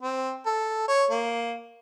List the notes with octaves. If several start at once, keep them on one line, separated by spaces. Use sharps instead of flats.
C4
A4
C#5
A#3